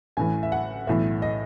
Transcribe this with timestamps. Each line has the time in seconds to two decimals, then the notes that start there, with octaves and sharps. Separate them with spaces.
0.17 A1 A2 E3 G#5
0.43 E5
0.52 F#5
0.87 B1 A2 E3 E5
1.22 D#5